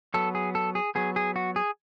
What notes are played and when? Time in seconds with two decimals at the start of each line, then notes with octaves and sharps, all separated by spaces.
0.14 F#3 B3 A4
0.35 G#4
0.55 A4
0.75 G#4
0.95 F#3 B3 G#4
1.16 G#4
1.36 F#4
1.56 G#4